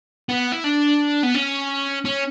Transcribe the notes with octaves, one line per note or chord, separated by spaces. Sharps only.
B3
E4
D4
B3
C#4
C#4